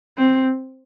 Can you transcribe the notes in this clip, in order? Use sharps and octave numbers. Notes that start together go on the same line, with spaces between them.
C4